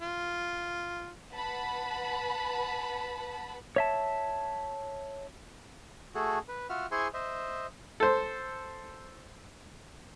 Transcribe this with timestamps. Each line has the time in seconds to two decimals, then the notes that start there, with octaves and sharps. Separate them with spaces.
0.01 F4
1.34 B4 F#5 A5 B5
3.76 C#5 E5 A5
6.15 A3 F#4 G#4 A4
6.49 B4
6.70 F4 F#4 E5 F#5 F6
6.92 E4 G#4 C5 G#5 C6 C#6
7.14 C5 D#5 E5
8.00 A4 C5